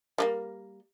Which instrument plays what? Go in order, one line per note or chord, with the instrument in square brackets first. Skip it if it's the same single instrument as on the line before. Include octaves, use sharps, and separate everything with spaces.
[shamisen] G3 A3 A#3